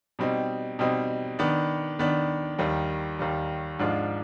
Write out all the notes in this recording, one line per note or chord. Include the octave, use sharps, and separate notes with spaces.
B2 G3 C4 D#4
B2 G3 C4 D#4
D#3 B3 D4
D#3 B3 D4
D#2 D#3 G3
D#2 D#3 G3
G#2 F3 G#3 D4 F4